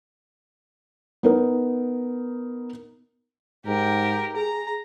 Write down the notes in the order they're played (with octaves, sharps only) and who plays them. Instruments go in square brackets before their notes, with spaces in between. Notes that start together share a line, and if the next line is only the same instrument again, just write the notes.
[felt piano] B3 D#4 A#4
[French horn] G#2 [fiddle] G4 A#4
[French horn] G#4 [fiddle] A#5